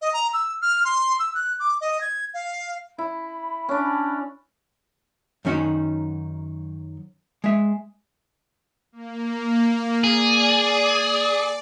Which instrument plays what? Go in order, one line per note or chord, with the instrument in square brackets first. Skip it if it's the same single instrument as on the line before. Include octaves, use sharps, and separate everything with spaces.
[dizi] D#5
A#5
E6
F6
C6
E6
F#6
D6
D#5
G#6
F5
[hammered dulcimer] E4 [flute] B5
[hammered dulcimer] C#4 D4 D5
[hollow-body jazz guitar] F#2 D#3 C#4 D#4 F#4
G#3 E5
[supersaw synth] A#3
[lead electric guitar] G#4 [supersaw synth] D5